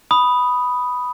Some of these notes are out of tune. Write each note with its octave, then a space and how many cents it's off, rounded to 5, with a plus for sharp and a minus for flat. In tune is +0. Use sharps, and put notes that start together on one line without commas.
B5 +0 D#6 +0